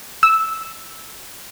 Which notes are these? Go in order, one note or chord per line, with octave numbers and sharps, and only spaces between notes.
E6